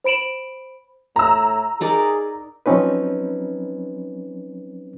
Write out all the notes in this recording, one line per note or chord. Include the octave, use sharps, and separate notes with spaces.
C5 B5 D7 E7 F#7
A2 A#5 E6
D#4 G#4 A#4 D5
F3 F#3 C4 C#4 D#4 B4